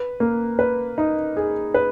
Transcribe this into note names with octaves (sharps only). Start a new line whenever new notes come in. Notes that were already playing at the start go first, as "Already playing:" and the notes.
Already playing: B4
A#3
B4
D#4
G#4
B4